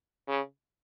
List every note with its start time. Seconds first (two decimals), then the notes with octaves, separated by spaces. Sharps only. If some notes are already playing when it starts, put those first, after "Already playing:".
0.28 C#3